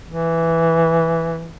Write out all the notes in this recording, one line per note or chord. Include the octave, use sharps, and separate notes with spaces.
E3